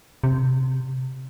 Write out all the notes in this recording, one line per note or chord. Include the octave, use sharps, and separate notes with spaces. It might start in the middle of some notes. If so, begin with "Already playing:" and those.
C3